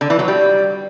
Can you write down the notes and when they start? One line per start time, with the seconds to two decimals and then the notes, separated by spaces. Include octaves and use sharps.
0.01 D3
0.10 E3
0.19 F#3
0.28 G3